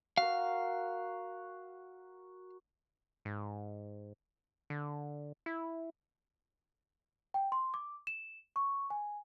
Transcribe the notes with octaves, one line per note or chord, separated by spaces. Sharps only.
F#4 A#4 F5
G#2
D3
E4
G5
C6
D6
E7
C#6
G#5